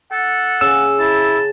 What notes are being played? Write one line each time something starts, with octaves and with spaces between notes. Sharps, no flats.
A4 F#5
C#3 E6
E4 A5